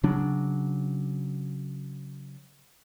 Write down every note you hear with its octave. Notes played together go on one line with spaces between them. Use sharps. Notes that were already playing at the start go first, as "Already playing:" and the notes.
C#3 F#3 D4